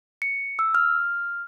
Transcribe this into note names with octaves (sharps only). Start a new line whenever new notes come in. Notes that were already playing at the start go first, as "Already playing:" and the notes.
C#7
E6
F6